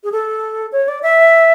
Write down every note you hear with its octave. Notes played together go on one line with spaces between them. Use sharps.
G#4
A4
C#5
D5
E5